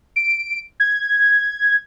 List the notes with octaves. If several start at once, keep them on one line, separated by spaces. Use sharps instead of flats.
D7
G#6